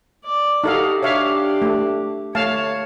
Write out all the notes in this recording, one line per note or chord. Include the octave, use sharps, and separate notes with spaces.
D5
D#4 F#4 G4 A4 F5
D4 G4 C#5 E5 F5
A3
A3 C#5 F5 A5